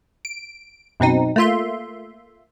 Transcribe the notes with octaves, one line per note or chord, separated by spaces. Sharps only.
D7
F#2 B2 C4 D#4
A3 A#3 F4 E5 C6